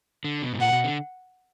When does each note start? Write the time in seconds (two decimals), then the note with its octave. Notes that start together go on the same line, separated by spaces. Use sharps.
0.24 D3
0.42 B2
0.53 G#2
0.61 A#2 F#5
0.72 B2
0.84 D3